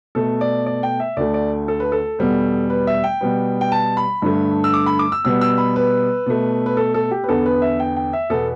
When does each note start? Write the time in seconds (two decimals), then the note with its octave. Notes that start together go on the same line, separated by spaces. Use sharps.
0.15 B2 A3 A4
0.41 D5
0.66 D5
0.83 G5
1.00 E5
1.17 D2 D3 A3 D5
1.34 D5
1.68 A4
1.80 B4
1.92 A4
2.19 E2 B2 G3 B3
2.70 B4
2.87 E5
3.04 G5
3.21 B2 G3 B3
3.61 G5
3.72 A5
3.97 B5
4.22 G2 D3 A3
4.64 E6
4.74 D6
4.86 B5
4.99 D6
5.12 E6
5.25 B2 G3 B3 E6
5.41 E6
5.58 B5
5.76 B4
6.26 B2 A3
6.66 B4
6.77 A4
6.94 A4
7.11 G4
7.24 B4
7.28 E2 D3 B3 A4
7.46 B4
7.62 E5
7.80 G5
7.96 G5
8.13 E5
8.30 E2 B2 B3 A4